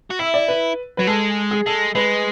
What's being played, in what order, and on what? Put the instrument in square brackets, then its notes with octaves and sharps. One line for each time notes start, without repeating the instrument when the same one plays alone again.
[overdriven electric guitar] F#4
[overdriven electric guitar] E4 [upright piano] E5
[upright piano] D5
B4
[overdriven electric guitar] F#3 [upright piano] B4
[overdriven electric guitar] G#3 [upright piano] A4
[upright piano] G#4
[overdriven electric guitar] G#3 [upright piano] A4
[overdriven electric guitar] G#3 [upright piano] B4